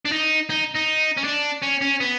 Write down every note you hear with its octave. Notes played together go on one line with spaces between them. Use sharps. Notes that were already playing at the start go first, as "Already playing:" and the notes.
D4
D#4
D#4
D#4
C#4
D4
C#4
C#4
B3